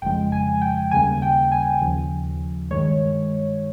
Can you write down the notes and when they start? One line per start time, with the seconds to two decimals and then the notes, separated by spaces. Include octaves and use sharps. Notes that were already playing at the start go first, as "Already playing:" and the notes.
0.02 G1 F2 C#3 F3 G#3 G5
0.32 G#5
0.61 G5
0.91 D#2 C#3 G3 A#3 G#5
1.22 G5
1.52 G#5
1.81 D#2 C#3 F3
2.71 G2 D#3 G#3 C#5